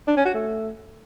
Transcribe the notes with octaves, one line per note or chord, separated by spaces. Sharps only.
D4
C#4
F#4
A3